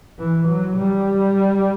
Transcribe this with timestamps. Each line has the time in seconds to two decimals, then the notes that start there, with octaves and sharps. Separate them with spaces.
0.19 E3
0.48 F#3
0.77 G3